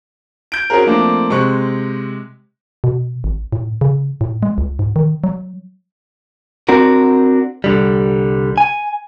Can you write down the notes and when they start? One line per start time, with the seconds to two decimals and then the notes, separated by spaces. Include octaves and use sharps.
0.52 G6 D7
0.70 C4 C#4 F#4 G#4 A#4
0.86 F3 A3 A#3 C4 D4
1.30 C3 G#3 C4 C#6 F#6
2.84 B2
3.24 G#1
3.52 A2
3.81 C#3
4.21 A2
4.43 G#3
4.58 C#2
4.79 G#2
4.96 D#3
5.24 F#3
6.69 C4 D4 F#4 A#4
7.64 C2 D3 G3
8.58 G#5